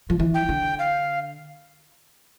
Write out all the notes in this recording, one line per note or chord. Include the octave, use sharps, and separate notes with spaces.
F3
E3
G5
D3
F5